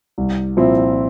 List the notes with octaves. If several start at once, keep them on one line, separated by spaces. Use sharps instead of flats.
C2
A#2 F3 C4 E4